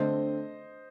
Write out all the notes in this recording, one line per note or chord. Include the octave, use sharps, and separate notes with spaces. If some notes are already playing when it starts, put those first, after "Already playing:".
Already playing: D3 A3 C4 C5 D#5